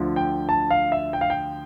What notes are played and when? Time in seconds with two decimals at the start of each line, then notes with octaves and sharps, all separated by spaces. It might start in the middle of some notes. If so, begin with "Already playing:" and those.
Already playing: D2 D3 F3
0.16 G5
0.49 A5
0.71 F5
0.92 E5
1.13 G5
1.21 F5
1.30 G5